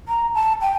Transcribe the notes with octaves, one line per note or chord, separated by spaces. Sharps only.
A#5
A5
G5